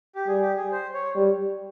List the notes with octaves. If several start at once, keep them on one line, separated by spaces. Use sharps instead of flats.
G4
G3 G#4
G4
G#4
C5
C#5
G3